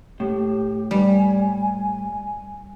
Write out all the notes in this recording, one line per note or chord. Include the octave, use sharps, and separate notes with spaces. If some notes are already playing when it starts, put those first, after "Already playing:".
A2 G4
G3 G#5